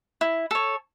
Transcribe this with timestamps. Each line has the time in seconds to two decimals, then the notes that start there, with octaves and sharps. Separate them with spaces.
0.21 E4
0.51 A4 C#5